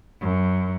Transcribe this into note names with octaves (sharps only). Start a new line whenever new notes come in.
F#2